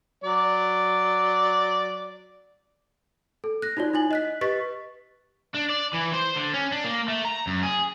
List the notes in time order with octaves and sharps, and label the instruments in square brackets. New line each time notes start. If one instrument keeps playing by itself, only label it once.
[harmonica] F#3 D5
[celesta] A4
F#6 A#6
D#4 F4 F#4 C#5 D5
D#4 E4 G#5 F#7
D#5 F#6 B6
G4 B4 D#5 C#6 A6 B6
[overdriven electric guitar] D4
D5
E3
C5
D3
C#4
D4
A#3
A3
A#5
F#2
G#4